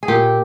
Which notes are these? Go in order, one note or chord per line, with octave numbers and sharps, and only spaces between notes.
G#4
A#2 G4